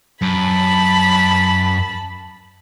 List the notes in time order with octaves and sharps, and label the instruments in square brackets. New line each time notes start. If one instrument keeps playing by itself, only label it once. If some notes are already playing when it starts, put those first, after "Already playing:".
[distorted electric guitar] F#2 [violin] A5 B5